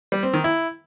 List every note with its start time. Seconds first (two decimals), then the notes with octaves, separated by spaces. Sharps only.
0.12 G3
0.23 C4
0.34 D#3
0.44 E4